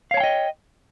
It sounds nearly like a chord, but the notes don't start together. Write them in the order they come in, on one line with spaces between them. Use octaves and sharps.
F5 C#5 A5 G5 D#5